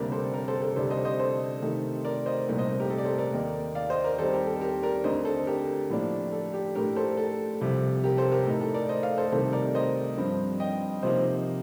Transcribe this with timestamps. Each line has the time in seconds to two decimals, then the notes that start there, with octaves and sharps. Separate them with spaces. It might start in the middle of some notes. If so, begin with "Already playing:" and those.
Already playing: D2 C3 G3 A#3 D4 A#4 D5
0.12 A4 C5
0.34 A#4 D5
0.48 A4 C5
0.62 A4
0.76 D2 C3 G3 D4 A4 C5
0.90 C5 D#5
1.05 C5 D#5
1.19 A4 C5
1.62 C3 D#3 A3 D#4
2.05 A#4 D5
2.26 C5 D#5
2.47 C2 A#2 A3 C4 D#4
2.58 C5 D#5
2.80 G4 A#4
2.90 A4
2.98 D5
3.05 A4 C5
3.18 A#4 D5
3.33 D#2 D#3 A#3 D#4
3.75 D5 F5
3.90 C5 D#5
4.04 A#4 D5
4.18 D#2 D#3 G3 C4 D#4 A4 C5
4.33 G4 A#4
4.47 A4
4.61 G4 A#4
4.83 A#4 D5
5.04 D2 D3 A3 C4 C5 D#5
5.25 A4 C5
5.47 G4 A#4
5.90 A2 F3 A#3 D4
6.32 A4
6.54 G4
6.75 A2 A3 D4 G4 A#4
6.96 A4 C5
7.17 A4
7.61 C2 C3 F3
8.04 G4 A#4
8.17 A4 C5
8.32 G4 A#4
8.46 A2 A3 D#4 A4
8.61 A4
8.74 A#4 D5
8.89 C5 D#5
9.03 D5 F5
9.18 A4 C5
9.32 C2 C3 D#3 A3 D#4 A4 C5
9.53 A#4 D5
9.75 C5 D#5
10.17 G2 F3 C4
10.60 D#5 G5
11.02 C3 F3 A#3 D#4 C5 D#5